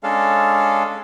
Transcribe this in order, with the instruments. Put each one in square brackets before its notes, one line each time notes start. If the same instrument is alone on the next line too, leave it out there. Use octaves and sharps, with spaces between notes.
[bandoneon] G#3 C#4 D4 A4 F5